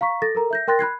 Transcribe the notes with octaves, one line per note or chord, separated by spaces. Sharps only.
F5 A#5 C#6 B6
A4 A6 A#6
A4 A#4 A#5
E5 G6 A#6
A#4 G5 C6 F#6 A6 A#6
B5 F#6 G#6 C7